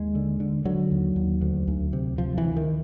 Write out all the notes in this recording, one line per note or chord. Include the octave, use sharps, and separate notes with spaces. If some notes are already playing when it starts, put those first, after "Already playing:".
Already playing: D#2 G#3
D3
D3
D3 F#3
D#2
D#2
D2
D2
C3
C3 F3
E3
D2
D#3